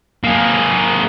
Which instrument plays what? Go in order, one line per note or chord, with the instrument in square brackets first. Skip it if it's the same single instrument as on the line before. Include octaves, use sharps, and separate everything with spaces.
[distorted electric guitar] A#3 G#4